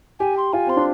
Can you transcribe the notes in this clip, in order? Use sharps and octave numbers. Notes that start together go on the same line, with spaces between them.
G4 G#5
C6
F4 G#5
C4 C6
D4